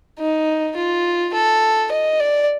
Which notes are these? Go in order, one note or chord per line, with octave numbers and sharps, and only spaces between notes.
D#4
F4
A4
D#5
D5